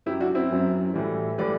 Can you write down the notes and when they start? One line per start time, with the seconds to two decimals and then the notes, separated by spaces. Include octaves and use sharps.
0.06 F#2 E4 G4
0.09 F#3
0.20 D4 F#4
0.35 C4 E4
0.51 F#2 F#3
0.94 A2 E3 G3
1.38 A2 E3 G3 B4 D5